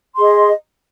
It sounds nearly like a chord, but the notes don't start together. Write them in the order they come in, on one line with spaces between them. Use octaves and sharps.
C6 G#4 D#5